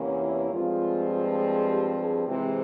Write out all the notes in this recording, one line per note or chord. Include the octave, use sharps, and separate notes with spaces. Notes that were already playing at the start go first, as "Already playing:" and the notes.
Already playing: E2 C3 E3 A#3 C#4
E4
G2 F3 G#3 C4 F4
G#4
G4
G#4
C3 E3 G#3 C4 G4